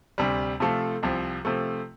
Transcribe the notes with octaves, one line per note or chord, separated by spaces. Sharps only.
D2 C3 G3
C3 F3 A3 F4 A4
C2 C3 F3
C3 F3 A3